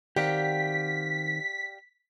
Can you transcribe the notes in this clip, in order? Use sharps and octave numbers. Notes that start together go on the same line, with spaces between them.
D#3 C4 G4 D5 F5 F#5 B6